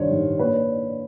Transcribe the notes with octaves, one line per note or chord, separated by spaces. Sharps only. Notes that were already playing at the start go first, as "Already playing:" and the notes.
Already playing: G2 D#3 C5 C#5
D#3
A#2 B4 C#5